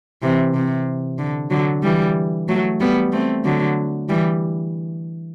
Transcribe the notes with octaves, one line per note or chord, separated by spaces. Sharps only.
C3 E3
C3
D3
D3 F#3
E3 G3
F#3 A3
G3 B3
A3 C4
D3 F#3
E3 G3